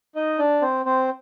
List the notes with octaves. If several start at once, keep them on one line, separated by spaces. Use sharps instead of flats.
D#4 D#5
D4 D5
C4 C5
C4 C5